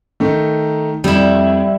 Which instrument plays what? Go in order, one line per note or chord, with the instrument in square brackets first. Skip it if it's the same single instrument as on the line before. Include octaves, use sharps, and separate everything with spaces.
[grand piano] D#3 A3 D#4
[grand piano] F2 [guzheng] G3 E4